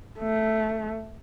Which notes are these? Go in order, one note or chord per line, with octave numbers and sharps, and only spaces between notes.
A3